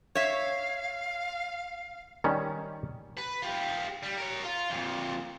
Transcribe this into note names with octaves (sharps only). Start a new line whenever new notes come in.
C#5 E5 F5
D#3 G3 C#4
B4
F4 G4
G3
A#4 C#5
F4
F2 A#2